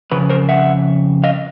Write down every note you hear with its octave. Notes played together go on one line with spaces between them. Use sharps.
F2 C#3 B4
A#4 C5
E5 F#5
D#5 F5